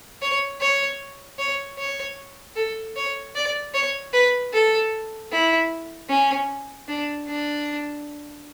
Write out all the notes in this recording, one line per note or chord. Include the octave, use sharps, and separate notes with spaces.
C#5
C#5
C#5
C#5
A4
C#5
D5
C#5
B4
A4
E4
C#4
D4
D4